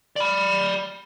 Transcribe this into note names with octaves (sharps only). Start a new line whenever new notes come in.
D5 B5